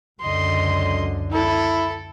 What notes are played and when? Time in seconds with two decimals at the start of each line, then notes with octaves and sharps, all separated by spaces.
0.21 C#2 F#2 D3 D#5 C6
1.32 E4 A4